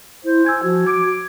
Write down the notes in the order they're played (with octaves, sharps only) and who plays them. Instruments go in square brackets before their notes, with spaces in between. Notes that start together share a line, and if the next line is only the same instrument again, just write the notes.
[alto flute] E4 [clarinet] C5
[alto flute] G#5 [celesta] E6 G#6
[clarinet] F3 [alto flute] F#4
[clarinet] D6 [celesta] G#6 D7